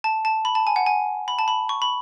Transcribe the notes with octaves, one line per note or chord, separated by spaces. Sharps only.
A5
A5
B5
A5
G#5
F#5
G#5
B5
A5
B5
C#6
B5